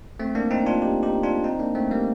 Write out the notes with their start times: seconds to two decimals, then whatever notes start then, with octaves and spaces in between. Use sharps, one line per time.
0.19 A3 C4
0.35 A#3 D4
0.51 C4 D#4
0.66 D4 F4
0.82 D#4 G4
1.03 D#4 G4
1.23 D4 F4
1.44 C4 D#4
1.60 A#3 D4
1.75 A3 C4
1.91 G3 A#3